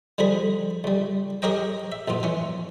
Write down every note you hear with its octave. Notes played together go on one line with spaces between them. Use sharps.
D3 F3 G3 G#4 B5
C#2 G3
G4 G#4 A#4 C#5 D#5 G5
E5
A#1 F#2 B2 F4
E3 C#4